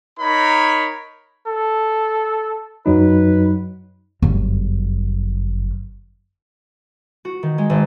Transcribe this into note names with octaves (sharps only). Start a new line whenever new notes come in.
D#4 A#4 C#5 B5
A4
F#2 F#3 D#4 B4
G1 F#2
F#4
D#3
G#3
G#1